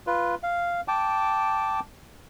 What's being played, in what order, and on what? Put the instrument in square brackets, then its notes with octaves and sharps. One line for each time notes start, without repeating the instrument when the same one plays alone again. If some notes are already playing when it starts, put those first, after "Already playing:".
[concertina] F4 B4
F5
G5 A5 D6